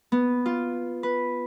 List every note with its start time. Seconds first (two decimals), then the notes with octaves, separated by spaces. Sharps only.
0.12 B3
0.46 F4
1.03 B4